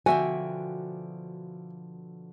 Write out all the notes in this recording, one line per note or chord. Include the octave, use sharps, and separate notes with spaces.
B2 D3 F3 F#4 E5 G5 G#5